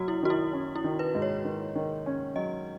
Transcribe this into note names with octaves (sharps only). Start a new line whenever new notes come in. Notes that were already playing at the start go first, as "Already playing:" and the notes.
Already playing: F#3 F#4
E4
D#3 F#4
E4
C#4
E4
D#3
B4
G#2
C#5
D#3
D#3
C#4
F#3 D#5